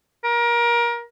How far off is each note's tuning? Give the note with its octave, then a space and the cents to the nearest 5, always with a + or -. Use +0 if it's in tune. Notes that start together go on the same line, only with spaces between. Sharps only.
A#4 +25